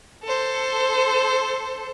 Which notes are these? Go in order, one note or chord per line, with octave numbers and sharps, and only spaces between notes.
A4 C5